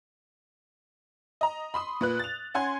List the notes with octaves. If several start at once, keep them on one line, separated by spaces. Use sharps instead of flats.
D#5 A#5
B5 C6 D#6
A#2 B4 F#6
A6 F7
C#4 F#5 G#5 C6 G#6